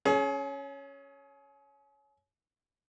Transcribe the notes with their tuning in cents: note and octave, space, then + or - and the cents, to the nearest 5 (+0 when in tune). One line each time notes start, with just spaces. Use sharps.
C#4 +0 G#4 +35